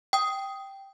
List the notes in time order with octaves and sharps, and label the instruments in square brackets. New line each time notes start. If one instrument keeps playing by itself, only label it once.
[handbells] G5 D#6